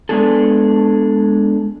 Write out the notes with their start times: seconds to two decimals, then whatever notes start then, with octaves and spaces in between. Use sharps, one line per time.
0.09 G#3 B3 D4 G#4 A4